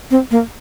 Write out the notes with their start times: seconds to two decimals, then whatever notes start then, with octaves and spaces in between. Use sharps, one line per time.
0.11 C4
0.31 A#3